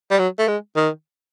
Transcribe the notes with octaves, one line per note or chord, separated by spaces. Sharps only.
G3
F#3
A3
G#3
D#3